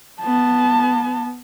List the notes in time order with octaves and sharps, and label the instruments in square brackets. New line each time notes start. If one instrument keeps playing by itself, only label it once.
[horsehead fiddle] B3 A5